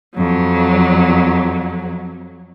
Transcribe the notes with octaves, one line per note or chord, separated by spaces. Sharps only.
F2 F#3